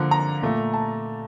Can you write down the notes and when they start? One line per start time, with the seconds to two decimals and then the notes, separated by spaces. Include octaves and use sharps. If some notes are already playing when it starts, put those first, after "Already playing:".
Already playing: D3 F3 A#3
0.11 A#5
0.42 A#2 A3
0.73 A5